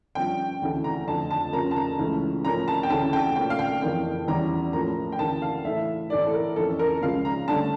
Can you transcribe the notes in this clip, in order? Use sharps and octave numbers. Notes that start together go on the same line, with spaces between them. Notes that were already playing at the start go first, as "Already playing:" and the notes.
G2 F3 C#4 G5
D2 C#3 E3 A3
A#5
F2 D3 A3 A5
A5
F2 C#3 F3 A#3 C#4 A#5
A5
A#5
C#2 C#3 E3 A3 C#4
A2 F3 A#3 C#4 A#5
A5
G5
D2 C#3 E3 A3 C#4 A5
G5
A#2 A3 C#4 G5
F5
G5
F2 C#3 E3 A#3 C#4 G5
E2 E3 G3 C#4 A#5
A2 F3 A#3 C#4 A#5
G5
D2 C#3 E3 A#3 A5
F5
A2 E3 A3 E5
A2 E3 A3 D5
A4
A#4
F2 E3 A#3 C#4 A4
A#4
C#2 C#3 F3 F5
A#5
G2 D3 A3 C#4 A5